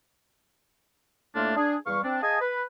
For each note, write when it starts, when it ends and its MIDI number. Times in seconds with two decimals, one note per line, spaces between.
1.35 1.56 45
1.35 1.56 57
1.35 1.56 58
1.35 1.56 62
1.35 1.56 65
1.56 1.75 62
1.56 1.75 68
1.87 2.00 40
1.87 2.00 55
1.87 2.00 71
1.87 2.00 77
1.87 2.00 85
2.04 2.20 60
2.04 2.20 62
2.22 2.39 68
2.22 2.39 75
2.22 2.39 77
2.22 2.39 80
2.22 2.39 81
2.22 2.39 87
2.41 2.63 71